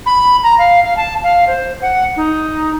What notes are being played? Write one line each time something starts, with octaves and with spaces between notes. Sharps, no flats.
B5
A#5
F5
F5
A5
F5
C5
F#5
D#4